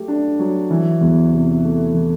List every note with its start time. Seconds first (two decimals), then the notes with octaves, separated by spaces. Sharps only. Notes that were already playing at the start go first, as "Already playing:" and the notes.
Already playing: F#3 A3 G4
0.08 D4
0.39 F#3
0.71 E3
1.01 E2
1.32 C3
1.63 A3
1.94 E3